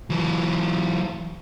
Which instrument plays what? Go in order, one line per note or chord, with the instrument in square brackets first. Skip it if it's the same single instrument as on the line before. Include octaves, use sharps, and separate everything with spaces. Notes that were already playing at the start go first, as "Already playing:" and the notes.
[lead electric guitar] E3 F#3